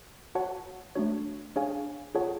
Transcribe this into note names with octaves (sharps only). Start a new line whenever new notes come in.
F#4 C#5 F#5 A5
A3 D4 F#4 C#5
D4 G#4 C#5 F5 G#5
F4 G#4 C#5 F#5 A5